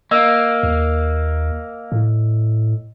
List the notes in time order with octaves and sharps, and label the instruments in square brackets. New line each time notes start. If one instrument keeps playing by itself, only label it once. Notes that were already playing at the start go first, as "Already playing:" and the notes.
[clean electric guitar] A#3 [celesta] D#5 E6
[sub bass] D#2
A2